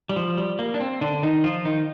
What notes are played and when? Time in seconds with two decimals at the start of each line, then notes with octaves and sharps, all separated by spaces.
0.09 G3
0.16 F3
0.37 G3
0.59 A#3
0.74 D4
0.81 C4
1.01 D3 D4
1.23 D#3 D#4
1.44 F3 F4
1.65 D#3 D#4